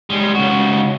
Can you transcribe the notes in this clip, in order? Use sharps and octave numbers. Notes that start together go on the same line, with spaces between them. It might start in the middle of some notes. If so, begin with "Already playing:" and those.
G3 G#3
C#2 F#4